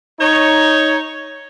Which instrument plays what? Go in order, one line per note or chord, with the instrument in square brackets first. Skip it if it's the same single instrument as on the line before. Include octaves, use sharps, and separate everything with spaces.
[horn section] D#4 C#5